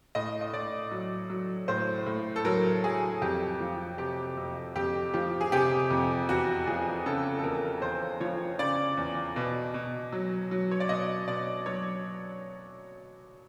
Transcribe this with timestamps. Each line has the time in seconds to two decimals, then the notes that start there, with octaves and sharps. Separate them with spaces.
0.15 A2 D#5
0.41 D#5
0.53 A2 D5
0.91 F#3
1.29 F#3
1.68 A2 C5
2.06 A2
2.36 A4
2.45 F#3 A#4
2.84 F#3 G#4
3.22 F2 G4
3.60 F3
3.98 C3 G4
4.37 F2
4.76 F2 G4
5.14 F3 G4
5.41 G#4
5.52 C3 G4
5.90 F2
6.29 E2 F#4
6.67 F3 G#4
7.06 C#3 A4
7.39 A4
7.44 E2 A#4
7.82 E2 C5
8.20 F3 C#5
8.59 C#3 D5
8.97 E2
9.36 B2
9.74 B2
10.12 F#3
10.51 F#3
10.71 C#5
10.80 D5
10.89 B2 D#5
11.28 B2 D5
11.66 F#3 C#5